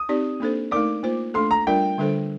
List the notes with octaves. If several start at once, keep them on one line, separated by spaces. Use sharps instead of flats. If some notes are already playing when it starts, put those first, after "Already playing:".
Already playing: D#6
C4 D#4 G4 D5
A#3 D4 A4 C5
A3 D#4 A#4 D5 D6
A#3 F4 C5
A3 D4 A4 C6
A#5
G3 D4 F4 A#4 D5 G5
D3 G3 D4 A4 C5